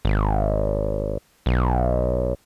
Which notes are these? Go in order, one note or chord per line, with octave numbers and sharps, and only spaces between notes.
G#1
B1